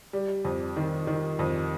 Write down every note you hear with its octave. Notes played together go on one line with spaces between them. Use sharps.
G3
F2
D#3
D#3
F2